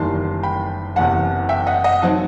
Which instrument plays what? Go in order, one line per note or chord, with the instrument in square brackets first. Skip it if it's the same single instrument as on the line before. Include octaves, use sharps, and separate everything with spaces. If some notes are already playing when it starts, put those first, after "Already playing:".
Already playing: [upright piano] F#1 E2 D#3 G3 A5 C6
G5 B5
F#1 E2 C3 F#5 A5
E5 G5
D#5 F#5
D#5 F#5
F#3 C4 D#4 F#5 A5